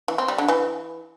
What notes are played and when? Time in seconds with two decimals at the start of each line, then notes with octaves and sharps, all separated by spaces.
0.08 E3
0.18 C4
0.28 G3
0.38 D3
0.48 E3